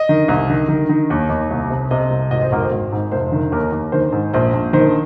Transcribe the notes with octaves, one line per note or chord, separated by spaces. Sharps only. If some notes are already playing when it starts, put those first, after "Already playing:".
Already playing: D#5
D#3
C2
D#3
D#3
D#3
D#2
D#2
C2
C3
C3 D#5
C2
G#1 D#5
C5
G#1 A#4
C5
G#1
G#2
F1 C5
D#3
D#2 A#4
D#2
D#3 C5
G#2
A#1 C5
A#1
D#3 C5